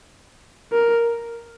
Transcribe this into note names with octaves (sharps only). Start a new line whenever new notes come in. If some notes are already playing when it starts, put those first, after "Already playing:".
A#4